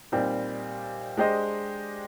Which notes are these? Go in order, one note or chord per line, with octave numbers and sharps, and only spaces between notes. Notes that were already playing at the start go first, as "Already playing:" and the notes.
A#2 G3 C4 D#4 G4
G#3 D4 G4 C5 D#5